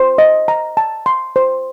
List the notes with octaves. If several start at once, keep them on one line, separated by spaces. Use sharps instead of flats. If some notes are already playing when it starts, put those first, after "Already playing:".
Already playing: C5
D#5
A#5
A5
C6
C5